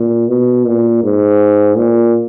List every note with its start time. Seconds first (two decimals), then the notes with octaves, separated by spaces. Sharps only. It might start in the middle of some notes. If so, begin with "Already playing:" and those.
Already playing: A#2
0.28 B2
0.66 A#2
1.03 G#2
1.77 A#2